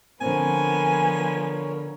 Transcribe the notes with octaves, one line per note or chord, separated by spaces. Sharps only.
D3 F3 B3 C4 A#4 C#5 G#5